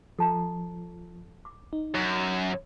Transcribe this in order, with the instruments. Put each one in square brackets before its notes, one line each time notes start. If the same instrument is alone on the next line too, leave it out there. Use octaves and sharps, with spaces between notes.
[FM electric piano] F3 [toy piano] A4 A5 A#5
[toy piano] D6
[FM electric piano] D#4
[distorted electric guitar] F#2